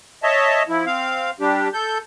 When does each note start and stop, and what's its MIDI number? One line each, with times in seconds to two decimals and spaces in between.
0.23 0.63 73
0.23 0.63 75
0.23 0.63 76
0.23 0.63 81
0.68 0.85 53
0.68 0.85 64
0.86 1.31 60
0.86 1.31 77
1.40 1.68 55
1.40 1.68 62
1.40 1.68 67
1.73 1.98 69
1.73 1.98 91